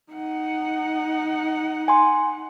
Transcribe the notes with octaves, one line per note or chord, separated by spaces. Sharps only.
D#4 F#5
G#5 C6